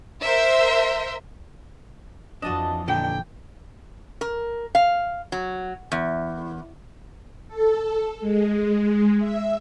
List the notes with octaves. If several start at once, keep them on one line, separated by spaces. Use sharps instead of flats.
A#4 C5 E5
F2 E3 F3 D4 F#4 D#5 A5
A#2 D3 G5
A#4
F5
F#3
E2
A4
G#3
E5